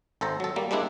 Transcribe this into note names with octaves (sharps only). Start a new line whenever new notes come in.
G#1 A4 C5 A#5
F#3 A4
G3 A#3
G3 G#3 A#3 D4 E4